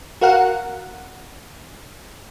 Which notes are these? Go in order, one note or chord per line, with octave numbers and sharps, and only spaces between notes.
F#4 A#4 F5 F#5